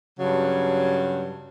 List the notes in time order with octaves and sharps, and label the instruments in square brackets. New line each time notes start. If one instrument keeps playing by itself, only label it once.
[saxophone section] G2 C#3 F#3